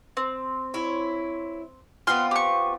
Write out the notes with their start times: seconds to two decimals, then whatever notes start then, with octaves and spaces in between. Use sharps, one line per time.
0.17 C4
0.74 E4 C#5
2.07 B3 C4 F4 C6 F6
2.31 G4 C#6